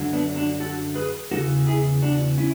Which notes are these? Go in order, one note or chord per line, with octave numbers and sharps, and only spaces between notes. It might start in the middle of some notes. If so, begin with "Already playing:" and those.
Already playing: F#2 D3 F#3
B3 D4
D4 F#4
F#4 A4
G#4 B4
E2 C#3 E3 F#4 A4
E4 G#4
D4 F#4
C#4 E4